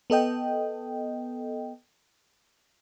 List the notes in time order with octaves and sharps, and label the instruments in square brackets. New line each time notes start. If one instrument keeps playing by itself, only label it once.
[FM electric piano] B3 A4 D#5 G5